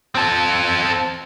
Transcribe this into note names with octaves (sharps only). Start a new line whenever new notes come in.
C4 A4